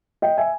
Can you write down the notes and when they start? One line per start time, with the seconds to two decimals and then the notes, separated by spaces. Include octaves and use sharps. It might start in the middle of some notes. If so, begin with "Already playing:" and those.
0.22 D#5 G5
0.37 E5 G#5